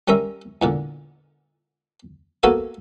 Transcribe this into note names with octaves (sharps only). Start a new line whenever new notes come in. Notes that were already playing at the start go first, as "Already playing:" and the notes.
G3 C#4 A#4 E5
E2 A#2 D3
A#3 B3 F#4 A4 F5 G#5